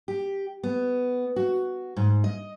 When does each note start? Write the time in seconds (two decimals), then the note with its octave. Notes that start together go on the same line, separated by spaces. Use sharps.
0.08 G4
0.63 B3
1.36 F#4
1.96 G#2
2.24 D#5